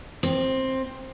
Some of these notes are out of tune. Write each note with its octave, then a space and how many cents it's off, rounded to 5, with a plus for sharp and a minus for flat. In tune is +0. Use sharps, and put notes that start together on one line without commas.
C4 +10